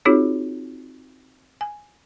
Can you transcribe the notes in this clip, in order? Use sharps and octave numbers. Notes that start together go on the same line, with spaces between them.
C4 D#4 F4 F#4 G#4 C#5
G#5